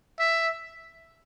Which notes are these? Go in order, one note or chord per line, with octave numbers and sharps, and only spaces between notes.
E5